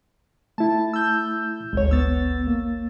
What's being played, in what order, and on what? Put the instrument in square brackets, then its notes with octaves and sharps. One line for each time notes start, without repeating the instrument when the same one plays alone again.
[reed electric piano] A3 E4 [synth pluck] A5
[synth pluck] E6 G6
[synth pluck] G#1 D2 C#5 [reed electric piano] G#3
[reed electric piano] D2 B3 [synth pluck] E6 A6
[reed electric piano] A#3